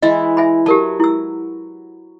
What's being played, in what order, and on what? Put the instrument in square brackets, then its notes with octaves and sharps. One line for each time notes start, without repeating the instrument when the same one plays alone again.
[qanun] E3 G#3 E4 [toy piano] D#5
[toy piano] E5 G#5 B5
[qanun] F#3 [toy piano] G4 A#4 A5
[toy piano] E4 E6